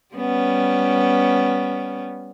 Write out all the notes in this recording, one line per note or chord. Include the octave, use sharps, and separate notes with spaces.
G3 B3 C#4